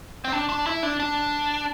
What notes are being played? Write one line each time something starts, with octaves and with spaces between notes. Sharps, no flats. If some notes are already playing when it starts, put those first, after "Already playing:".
C4
D4
D4
E4
D4
D4